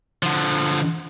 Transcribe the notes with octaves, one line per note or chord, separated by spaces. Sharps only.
D3 F3